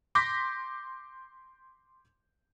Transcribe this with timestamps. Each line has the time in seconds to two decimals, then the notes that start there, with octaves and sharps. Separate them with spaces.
0.15 C6 D6 G6 A#6 B6